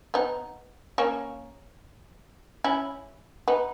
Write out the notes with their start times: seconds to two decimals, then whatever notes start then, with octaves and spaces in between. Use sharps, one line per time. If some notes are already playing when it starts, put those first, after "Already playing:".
0.14 B3 D#4
0.98 A#3 C#4
2.64 C#4 E4
3.48 B3 D#4